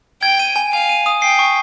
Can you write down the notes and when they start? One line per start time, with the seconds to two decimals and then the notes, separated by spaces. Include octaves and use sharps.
0.22 G5 G#6
0.39 D#7
0.56 G#5
0.73 F5 G#5
0.89 D#7
1.06 D#6
1.22 G5 C7
1.39 C#6